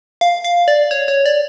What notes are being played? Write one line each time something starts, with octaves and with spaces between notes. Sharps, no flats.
F5
F5
D5
C#5
C#5
D5